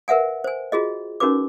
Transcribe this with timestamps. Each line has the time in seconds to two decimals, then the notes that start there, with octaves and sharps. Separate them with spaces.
0.08 A#4 B4 E5 F#5 G#5
0.44 C5 G#5
0.72 F4 F#4 G#4 D#5
1.20 C#4 D#4 F#4 A#4 B4 D6